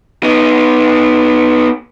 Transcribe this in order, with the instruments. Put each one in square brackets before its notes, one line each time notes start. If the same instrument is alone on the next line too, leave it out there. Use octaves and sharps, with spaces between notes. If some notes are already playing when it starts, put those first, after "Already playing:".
[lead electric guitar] B3 D#4